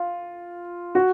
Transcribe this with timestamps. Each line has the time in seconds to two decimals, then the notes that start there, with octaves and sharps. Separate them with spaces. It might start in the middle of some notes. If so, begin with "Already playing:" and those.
Already playing: F4
0.95 F#4